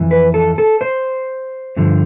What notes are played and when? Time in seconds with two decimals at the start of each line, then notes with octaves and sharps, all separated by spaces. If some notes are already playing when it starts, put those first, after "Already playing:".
Already playing: F2 E3
0.11 B4
0.34 A4
0.58 A4
0.81 C5
1.77 G2 D3 F3